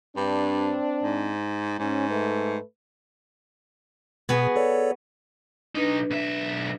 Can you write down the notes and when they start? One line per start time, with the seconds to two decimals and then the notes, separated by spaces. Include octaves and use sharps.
0.17 G2 C4 D4
1.03 G#2
1.79 G#2 C#4
2.10 A3 B4
4.29 B2 B3 F#4 G#4
4.56 A4 C#5 D5
5.75 B1 D4 D#4 B4
6.11 B1 E5